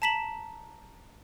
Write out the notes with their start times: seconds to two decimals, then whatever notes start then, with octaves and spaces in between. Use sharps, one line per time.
0.02 A5 A#5 B6 E7 F#7